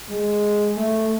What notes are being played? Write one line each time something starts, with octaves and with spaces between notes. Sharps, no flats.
G#3
A3